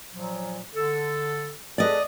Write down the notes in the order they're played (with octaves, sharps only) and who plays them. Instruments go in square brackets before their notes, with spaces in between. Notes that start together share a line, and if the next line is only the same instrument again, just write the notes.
[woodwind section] A#2 F3 F#3
D3 A4
[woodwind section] G#4 A4 B4 [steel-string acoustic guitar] D5 D#5